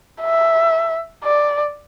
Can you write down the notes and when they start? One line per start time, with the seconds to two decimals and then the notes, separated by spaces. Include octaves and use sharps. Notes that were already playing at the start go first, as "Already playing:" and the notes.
0.21 E5
1.24 D5